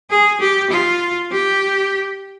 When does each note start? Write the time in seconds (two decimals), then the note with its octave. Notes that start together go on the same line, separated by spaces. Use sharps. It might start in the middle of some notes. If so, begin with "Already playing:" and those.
0.10 G#4
0.40 G4
0.71 F4
1.32 G4